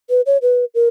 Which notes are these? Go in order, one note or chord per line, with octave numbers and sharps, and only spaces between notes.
B4
C#5
B4
A#4